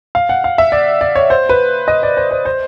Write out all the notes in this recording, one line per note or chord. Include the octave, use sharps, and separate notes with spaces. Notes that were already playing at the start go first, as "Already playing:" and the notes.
F5
F#5
F5
E5
D5
D5
C#5
C5
B4
D#5
D5
C5
C5
C5